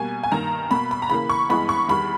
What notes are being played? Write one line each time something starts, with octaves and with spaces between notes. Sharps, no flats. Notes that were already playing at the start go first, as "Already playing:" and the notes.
Already playing: B2 G3 A#3 G#5
G#5
G2 D#3 A#3 A#5
B2 A#3 B5
B5
A#5
C#3 E3 A#3 B5
C#6
G2 E3 G#3 B3 B5
C#6
E2 D#3 G3 B5